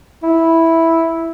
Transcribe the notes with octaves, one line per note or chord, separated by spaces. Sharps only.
E4